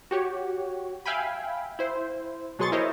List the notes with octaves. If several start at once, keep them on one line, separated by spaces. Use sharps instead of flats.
F#4 G4 C#5
E5 F5 G5 G#5 B5
E4 C5
B2 F#3 G#4 C6 C#6 A6
E4 A#4 C5 C#5 D#5